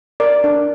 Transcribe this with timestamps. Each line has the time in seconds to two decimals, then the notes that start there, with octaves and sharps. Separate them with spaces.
0.20 A#4 D5
0.44 D4